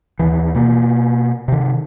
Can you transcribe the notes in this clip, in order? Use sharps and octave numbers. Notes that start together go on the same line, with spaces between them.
D#2 E3
B2 A#3
C3 D#3